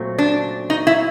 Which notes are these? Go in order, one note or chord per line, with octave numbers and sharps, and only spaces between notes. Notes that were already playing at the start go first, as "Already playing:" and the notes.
Already playing: A#2 F#3 A3 C4
D4
D#4
E4